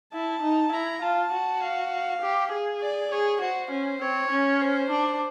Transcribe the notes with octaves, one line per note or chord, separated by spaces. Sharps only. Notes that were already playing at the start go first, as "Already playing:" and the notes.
E4 A5
D#4
E4 A#5
F4 A5
F#4
F5
G4
G#4
D5
G#4 C#5
F#4 C5
C#4
C4 C#5
C#4
C5
D4